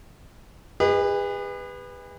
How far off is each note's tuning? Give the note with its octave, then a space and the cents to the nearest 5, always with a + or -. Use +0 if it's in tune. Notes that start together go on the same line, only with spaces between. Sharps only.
G#4 -40 B4 +0 D#5 +0